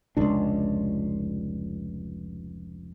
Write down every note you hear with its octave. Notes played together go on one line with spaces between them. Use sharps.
F1 C#2 D4